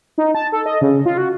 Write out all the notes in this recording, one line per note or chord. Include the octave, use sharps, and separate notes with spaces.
D#4
A5
A4
D#5
C#3
F4
F#4